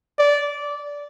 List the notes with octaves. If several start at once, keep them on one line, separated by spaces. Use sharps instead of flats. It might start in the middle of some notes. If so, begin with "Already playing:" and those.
D5